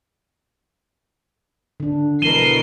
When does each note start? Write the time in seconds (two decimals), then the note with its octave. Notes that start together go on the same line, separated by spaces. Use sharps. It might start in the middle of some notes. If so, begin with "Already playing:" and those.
1.80 D3 D4
2.22 B2 E3 A#4 C7 D#7 E7 G7